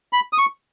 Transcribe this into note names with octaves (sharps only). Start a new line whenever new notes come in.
B5
D#6
C#6